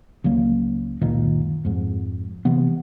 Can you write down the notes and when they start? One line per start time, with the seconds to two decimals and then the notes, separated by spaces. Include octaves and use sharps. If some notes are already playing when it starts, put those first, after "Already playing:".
0.24 C#2 F#3 A#3
1.01 C#2 F#2 A#2 D#3
1.65 F2 G#2
2.45 C3 E3 B3